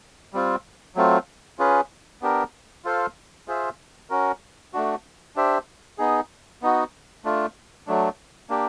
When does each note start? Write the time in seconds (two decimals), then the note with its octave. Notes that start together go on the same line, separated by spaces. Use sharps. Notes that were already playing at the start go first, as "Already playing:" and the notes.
0.34 G3 C4 F4
0.96 F#3 A3 C4 F4
1.59 C#4 F4 G#4 B4
2.22 B3 D4 G4 A#4
2.85 F4 A4 C5 F5
3.48 F4 G#4 C5 E5
4.10 C#4 F#4 A#4
4.74 A3 D4 F#4
5.36 D4 G4 C5 E5
5.98 B3 D#4 G#4
6.62 B3 D#4 F#4
7.25 A3 D4 F4
7.87 F#3 A3 D4
8.50 A#3 D4 G4